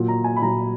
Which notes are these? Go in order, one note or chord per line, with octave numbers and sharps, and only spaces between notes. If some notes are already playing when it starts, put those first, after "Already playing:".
Already playing: A#2 F#3
A#5
G#5
B5
A#2 F#3 A#5